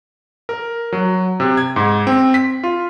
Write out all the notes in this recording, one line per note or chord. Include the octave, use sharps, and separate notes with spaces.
A#4
F#3
C3
G#6
G#2
C4
B6
F4